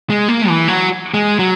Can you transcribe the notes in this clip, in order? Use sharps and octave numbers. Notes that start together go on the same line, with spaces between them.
G#3
A#3
E3
F#3
G#3
F#3